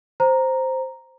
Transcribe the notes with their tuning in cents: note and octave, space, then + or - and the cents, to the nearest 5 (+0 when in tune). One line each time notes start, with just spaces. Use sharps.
C5 +0 A#5 +0